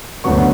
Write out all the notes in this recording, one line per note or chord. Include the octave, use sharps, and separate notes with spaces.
D2 D3 F#3 B3 C#6